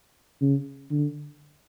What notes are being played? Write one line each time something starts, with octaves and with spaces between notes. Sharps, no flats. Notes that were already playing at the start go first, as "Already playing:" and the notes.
C#3
D3